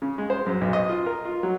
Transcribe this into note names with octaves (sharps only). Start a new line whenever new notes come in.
C#3
G#3
C5
F#2
B1
D#5
F4
A#4
F4
F#3